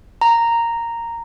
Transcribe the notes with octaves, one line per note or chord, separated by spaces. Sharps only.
A#5